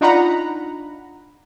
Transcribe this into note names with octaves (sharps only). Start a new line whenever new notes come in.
D4 D#4 F4 F#5 A#5 B5